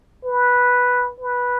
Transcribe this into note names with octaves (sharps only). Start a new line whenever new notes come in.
B4
B4